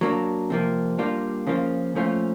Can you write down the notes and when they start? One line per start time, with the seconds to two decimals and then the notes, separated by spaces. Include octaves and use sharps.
0.01 F#3 A#3 D4
0.50 C3 F3 A#3
0.98 G3 A#3 D4 F4
1.47 C#3 F3 A#3 C#4 F4
1.95 A#2 F3 A3 C#4 F4